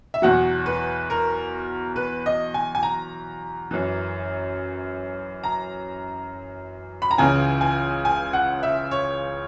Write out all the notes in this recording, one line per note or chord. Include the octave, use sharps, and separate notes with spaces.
E5
E2 B2 F#3 F#5
B4
A#4
B4
D#5
G#5
G#5
A#5
F#2 E3
A#5
B5
A#5
C#2 C#3 E3 G#5
G#5
G#5
F#5
E5
C#5